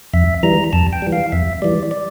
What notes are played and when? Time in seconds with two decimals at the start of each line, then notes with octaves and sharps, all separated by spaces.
0.13 F2 E5
0.43 E3 G3 A#5
0.73 F2 A5
0.93 G5
1.02 E3 G3
1.12 F5
1.32 F2 E5
1.62 E3 G3 D5
1.91 D5